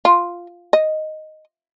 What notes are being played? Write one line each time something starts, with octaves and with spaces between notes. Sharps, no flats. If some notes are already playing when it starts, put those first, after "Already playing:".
F4
D#5